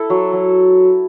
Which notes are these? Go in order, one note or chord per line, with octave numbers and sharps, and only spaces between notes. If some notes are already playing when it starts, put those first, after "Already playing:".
Already playing: E4 A4
F#3
F#3